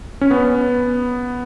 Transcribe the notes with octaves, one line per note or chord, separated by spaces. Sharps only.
C#4
B3